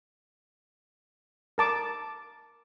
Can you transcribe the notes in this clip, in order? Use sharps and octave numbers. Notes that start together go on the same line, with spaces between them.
A#4 A5 D6